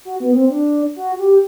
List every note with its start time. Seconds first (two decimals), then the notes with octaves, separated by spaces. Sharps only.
0.05 F#4
0.20 B3
0.34 C4
0.50 D4
0.96 F#4
1.19 G4